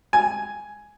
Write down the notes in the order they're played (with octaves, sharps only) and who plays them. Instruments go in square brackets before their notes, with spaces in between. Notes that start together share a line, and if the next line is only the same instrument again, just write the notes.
[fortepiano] G#5